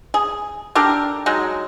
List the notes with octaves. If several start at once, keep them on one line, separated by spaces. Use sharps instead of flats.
G#4
D4 G4 A4 A#4
F#3 G#3 D#4